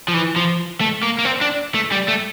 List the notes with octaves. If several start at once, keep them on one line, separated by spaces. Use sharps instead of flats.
F3
E3
F3
A3
A#3
A#3
C4
D4
A3
G3
A3